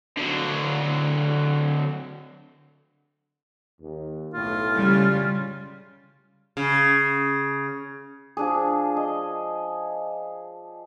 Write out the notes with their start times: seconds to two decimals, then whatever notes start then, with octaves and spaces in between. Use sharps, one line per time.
0.17 D3 F#3
3.80 D#2
4.34 B1 A2 F4
4.76 C#3 G3
6.57 C#3
8.37 F3 D4 G#4
8.97 D#5